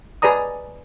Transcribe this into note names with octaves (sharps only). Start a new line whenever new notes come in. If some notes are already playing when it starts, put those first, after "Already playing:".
G#4 B4 D5 A#5 D#6